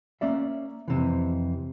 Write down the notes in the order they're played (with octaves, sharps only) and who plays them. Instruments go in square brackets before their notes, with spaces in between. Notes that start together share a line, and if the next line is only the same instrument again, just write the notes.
[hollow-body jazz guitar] A#3 C#4 D5 E5
F2 C3 E3